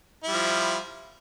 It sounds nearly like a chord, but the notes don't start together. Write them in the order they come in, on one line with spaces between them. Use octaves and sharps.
E4 G3 F3